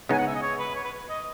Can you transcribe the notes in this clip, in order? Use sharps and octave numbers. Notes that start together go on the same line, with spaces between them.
C#3 G#3 B3 D#4 G#5
F#5
E5
D#5
C#5
B4
C#5
B4
D#5